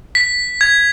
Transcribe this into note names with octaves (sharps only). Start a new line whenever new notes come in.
B6
G#6